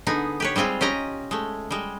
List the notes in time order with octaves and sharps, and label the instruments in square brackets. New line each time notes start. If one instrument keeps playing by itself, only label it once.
[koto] D3 B3 D#4 G#4
G4 B4 C#5
G3 G#3 C4 F4 G#4
C#4 G4 D#5 A#5
G#3 A3
G3 G#3